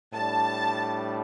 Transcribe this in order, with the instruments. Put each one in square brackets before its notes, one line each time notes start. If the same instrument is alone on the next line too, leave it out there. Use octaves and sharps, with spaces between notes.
[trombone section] A2 G3 D4 [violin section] A5